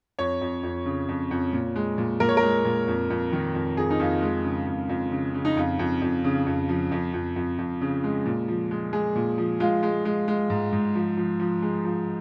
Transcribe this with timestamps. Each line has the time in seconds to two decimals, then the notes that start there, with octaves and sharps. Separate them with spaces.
0.19 F2 C#5
0.41 F2
0.63 F2
0.86 C#3
1.09 F2
1.31 F2
1.53 A#2
1.76 G#3
1.98 A#2
2.20 A#2 A#4
2.29 C#5
2.37 A#4
2.43 G#3
2.65 A#2
2.88 F2
3.10 F2
3.33 D#3
3.55 F2
3.77 F2 G#4
3.91 D#4
4.00 F2 F4
4.22 G#3
4.44 C#3
4.67 F2
4.89 F2
5.12 C#3
5.34 C#3
5.45 D#4
5.57 F2 F4
5.79 F2
6.02 F2
6.24 C#3
6.46 F2
6.69 F3
6.92 F2
7.13 F2
7.36 F2
7.58 F2
7.81 C#3
8.04 G#3
8.26 A#2
8.48 F3
8.71 G#3
8.93 G#3 G#4
9.15 A#2
9.38 F3
9.60 G#3 F4
9.83 G#3
10.05 G#3
10.28 G#3
10.50 G#2
10.73 G#2
10.95 F3
11.17 F3
11.40 F3
11.62 G#3
11.85 F3